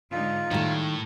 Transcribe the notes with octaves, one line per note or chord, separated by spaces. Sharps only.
G#2 D3 D#4 F4
A2 D#3 G3 A3